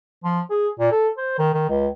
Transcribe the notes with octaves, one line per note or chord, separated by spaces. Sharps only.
F3
G#4
A#2
A4
C5
D#3
D#3
C#2